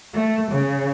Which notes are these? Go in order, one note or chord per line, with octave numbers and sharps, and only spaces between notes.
A3
C#3